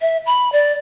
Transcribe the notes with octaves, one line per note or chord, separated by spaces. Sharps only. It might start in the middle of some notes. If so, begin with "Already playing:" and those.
E5
B5
D5